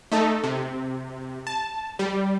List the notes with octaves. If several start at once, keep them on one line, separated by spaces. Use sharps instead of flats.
A3 D#4 A4
C3
A5
G3